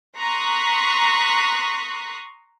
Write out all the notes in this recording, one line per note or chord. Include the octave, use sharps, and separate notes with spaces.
A#5 C6 C#6 D#6 F#6 B6